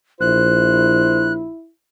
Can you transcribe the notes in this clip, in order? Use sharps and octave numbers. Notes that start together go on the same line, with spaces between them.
A#1 E4 C5 F#6